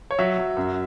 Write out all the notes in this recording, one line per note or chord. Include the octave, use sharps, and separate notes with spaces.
C#5
F#3 E5
F#3
F#2